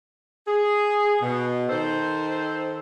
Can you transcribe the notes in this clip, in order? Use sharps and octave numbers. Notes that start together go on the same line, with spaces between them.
G#4
B2
D#3 A4 C5